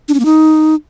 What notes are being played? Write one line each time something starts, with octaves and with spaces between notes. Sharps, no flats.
D4
C#4
A#3
D#4